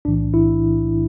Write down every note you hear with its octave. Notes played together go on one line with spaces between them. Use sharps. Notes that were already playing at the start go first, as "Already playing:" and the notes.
B1 A2 E3 D4
E4